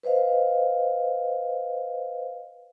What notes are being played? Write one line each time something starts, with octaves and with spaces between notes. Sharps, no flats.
B4 C5 D#5 F5